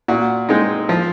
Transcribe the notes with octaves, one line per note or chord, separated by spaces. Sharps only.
A#2 F#4
G#3 C4 D#4
F3